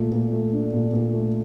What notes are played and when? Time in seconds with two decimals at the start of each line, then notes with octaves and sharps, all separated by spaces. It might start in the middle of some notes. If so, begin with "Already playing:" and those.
Already playing: A#2 A3
0.12 A#2
0.33 A3
0.53 D4
0.74 A#2
0.93 A#2
1.14 A3